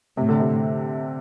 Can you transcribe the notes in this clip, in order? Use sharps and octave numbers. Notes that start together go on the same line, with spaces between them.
A2 C3
D3
C3